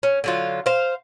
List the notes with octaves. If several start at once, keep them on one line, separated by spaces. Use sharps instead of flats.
C#4
D3 F#3 F4
C5 F5